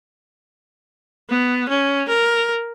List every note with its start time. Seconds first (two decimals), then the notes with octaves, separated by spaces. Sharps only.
1.29 B3
1.69 C#4
2.08 A#4